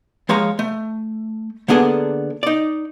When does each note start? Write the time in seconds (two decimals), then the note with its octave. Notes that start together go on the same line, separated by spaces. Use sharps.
0.29 F3 G#3 C#5 F5 A#5
0.59 A3
1.68 D3 A#3 B3 D4 G#4 A4
2.43 D#4 D5